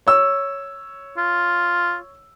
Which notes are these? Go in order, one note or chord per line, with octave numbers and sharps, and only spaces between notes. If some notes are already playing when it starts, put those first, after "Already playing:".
C#5 E6
F4